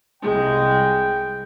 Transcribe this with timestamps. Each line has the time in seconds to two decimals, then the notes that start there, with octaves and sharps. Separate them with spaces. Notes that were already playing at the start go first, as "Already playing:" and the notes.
0.22 C2 G#3 G5